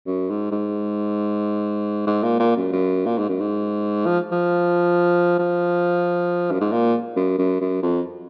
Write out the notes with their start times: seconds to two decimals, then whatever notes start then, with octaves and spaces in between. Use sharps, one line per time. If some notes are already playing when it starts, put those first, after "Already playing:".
0.06 F#2
0.30 G#2
0.51 G#2
2.06 G#2
2.23 A#2
2.40 A#2
2.57 F#2
2.72 F#2
3.06 A#2
3.18 G#2
3.29 F#2
3.40 G#2
4.06 F3
4.32 F3
5.39 F3
6.51 F#2
6.61 G#2
6.72 A#2
7.16 F#2
7.38 F#2
7.60 F#2
7.83 F2